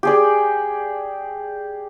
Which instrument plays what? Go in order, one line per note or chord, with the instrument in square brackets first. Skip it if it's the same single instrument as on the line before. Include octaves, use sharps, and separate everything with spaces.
[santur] G4 G#4 D5